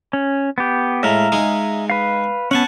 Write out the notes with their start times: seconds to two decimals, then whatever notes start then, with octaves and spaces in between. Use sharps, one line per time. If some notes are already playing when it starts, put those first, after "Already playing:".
0.13 C#4
0.58 B3 G4
1.03 A2 G#3 E5 F5 A#5
1.32 G#3 D#4 G#4
1.90 B4 F5
2.51 B3 C#4 F#5 G#5 A5